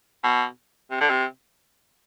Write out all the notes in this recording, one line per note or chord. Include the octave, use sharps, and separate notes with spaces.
B2
C3
D3
C3